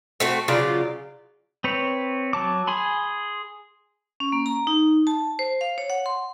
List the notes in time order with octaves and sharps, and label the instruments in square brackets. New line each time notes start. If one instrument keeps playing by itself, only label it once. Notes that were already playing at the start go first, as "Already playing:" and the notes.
[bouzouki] A3 C4 F#4
C#3 F#3 F4 D5
[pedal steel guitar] C4 B4 C#5
F#3 A5 D6
G#4 G#5 B5 C6
[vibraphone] C#4
A#3
A#5
D#4
A5
C5
F5
C#5
F#5
C6